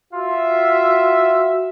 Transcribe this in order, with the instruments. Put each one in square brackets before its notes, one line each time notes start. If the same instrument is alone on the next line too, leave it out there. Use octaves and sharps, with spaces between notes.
[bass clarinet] F4 [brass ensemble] F#4 E5